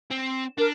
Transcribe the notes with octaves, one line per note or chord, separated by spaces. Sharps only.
C4
D4 A#4